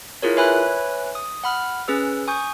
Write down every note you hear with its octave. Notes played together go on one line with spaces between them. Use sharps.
E4 F4 G#4 A#4 C#5
B4 C#5 E5 G#5 B5 F#6
D#6
F#5 B5 F6
C#4 G#4 B4 E6
G#5 C#6 D#6 G6